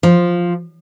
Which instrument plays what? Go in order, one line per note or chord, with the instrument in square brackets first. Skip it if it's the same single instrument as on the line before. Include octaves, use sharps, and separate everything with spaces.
[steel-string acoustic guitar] F3